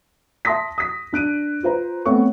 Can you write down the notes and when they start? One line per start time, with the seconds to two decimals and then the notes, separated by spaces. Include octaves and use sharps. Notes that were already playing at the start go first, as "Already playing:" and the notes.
0.45 E5 A5 C6 D#6 A#6 B6
0.78 D#6 B6
1.13 D4 F#6 D7 D#7
1.63 F4 B4 C5 A#5
2.06 A3 B3 C4 C#5 C#6